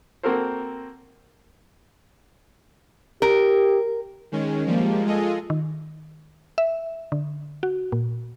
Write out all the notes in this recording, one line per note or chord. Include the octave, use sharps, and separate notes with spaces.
A#3 C4 F#4 A4 A#4 C5
G4 A#4
D#3 G#3 C#4
F3 G3 G#3 A#3
G#3 F4 G#4 A4 D#5
D#3
E5
D3
F#4
A#2